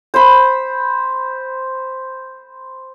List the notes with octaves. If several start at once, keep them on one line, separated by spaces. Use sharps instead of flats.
C5 B5